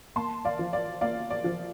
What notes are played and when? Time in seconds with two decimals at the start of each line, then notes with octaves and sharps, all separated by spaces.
0.16 A#3 A5 C6
0.45 D5 F5
0.59 F3
0.73 D5 F5
1.01 A#3 D5 F5
1.30 D5
1.44 F3